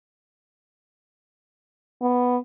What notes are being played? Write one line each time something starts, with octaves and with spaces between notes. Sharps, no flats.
B3